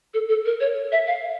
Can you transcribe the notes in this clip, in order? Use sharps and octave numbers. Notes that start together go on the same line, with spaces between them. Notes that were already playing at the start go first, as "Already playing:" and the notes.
A4
A4
A#4
C#5
E5
F5